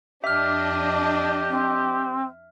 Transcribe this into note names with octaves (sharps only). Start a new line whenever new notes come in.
F2 D4 G4 D#5 E5 F6
C4